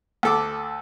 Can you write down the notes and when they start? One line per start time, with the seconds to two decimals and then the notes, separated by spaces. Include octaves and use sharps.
0.23 D2 A4 D6